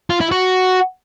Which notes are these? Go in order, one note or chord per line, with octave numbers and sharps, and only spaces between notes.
F4
E4
F#4